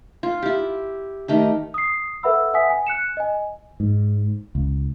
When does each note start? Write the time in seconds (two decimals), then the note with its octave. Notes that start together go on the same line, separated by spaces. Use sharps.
0.23 F4
0.42 E4 G4
1.28 D#3 A3 G4
1.74 D#6 C7
2.23 A4 B4 E5 F#5 B5 E6
2.54 E5 F#5 G#5 D#6 B6
2.70 G#5
2.87 F#6 C#7 E7
3.17 D#5 G#5
3.80 G#2
4.55 C#2